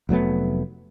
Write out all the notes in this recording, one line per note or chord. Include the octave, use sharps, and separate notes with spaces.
F1 F#3 A3 B3